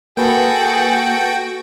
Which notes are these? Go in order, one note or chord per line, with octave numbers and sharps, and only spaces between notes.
A#3 F#4 G#4 A4 B4 F#5 G5